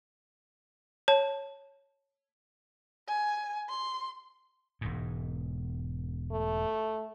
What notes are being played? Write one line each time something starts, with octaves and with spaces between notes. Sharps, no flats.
C#5 A5
G#5
C6
E1 G#2
A3